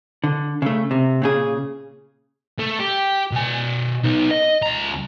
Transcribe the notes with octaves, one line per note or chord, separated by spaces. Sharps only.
D3
C#3 A3
C3
A#2 C#3 G#4
A3
G4
B2 G#5
B3 D#4
D#5
C#2 A#5